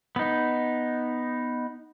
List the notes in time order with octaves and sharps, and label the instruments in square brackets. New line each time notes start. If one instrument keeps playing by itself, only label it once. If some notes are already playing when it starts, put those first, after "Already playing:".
[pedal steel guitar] B3 D#4